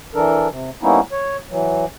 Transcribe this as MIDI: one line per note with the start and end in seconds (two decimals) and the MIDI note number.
0.14 0.48 52
0.14 0.48 62
0.14 0.48 69
0.14 0.48 70
0.50 0.70 48
0.82 1.00 55
0.82 1.00 58
0.82 1.00 59
0.82 1.00 61
0.82 1.00 63
0.82 1.00 64
1.12 1.37 73
1.50 1.85 52
1.50 1.85 54